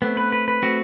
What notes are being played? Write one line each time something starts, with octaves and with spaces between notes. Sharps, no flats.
A3 B3 C4
B4
B4
B4
A3 C4 F#4